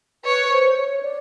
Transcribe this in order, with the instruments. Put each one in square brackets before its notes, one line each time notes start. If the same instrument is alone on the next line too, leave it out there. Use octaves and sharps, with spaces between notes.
[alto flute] B4 [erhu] C#5
[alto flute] C5
C#5
D5